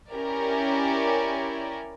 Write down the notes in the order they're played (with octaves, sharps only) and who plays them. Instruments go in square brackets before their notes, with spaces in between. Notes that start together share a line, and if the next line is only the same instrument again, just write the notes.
[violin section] C#4 E4 G4 A#4 D5